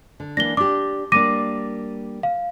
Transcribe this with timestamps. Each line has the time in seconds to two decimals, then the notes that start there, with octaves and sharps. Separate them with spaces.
0.20 D3
0.37 E3 A#3 D4 A#6 G7
0.57 D4 G4 D6
1.12 G3 A#3 D4 D6 A#6 D#7
2.23 F5